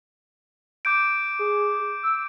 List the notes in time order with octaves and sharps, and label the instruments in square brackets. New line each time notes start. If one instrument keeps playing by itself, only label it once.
[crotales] D6 G6 D7
[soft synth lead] G#4
E6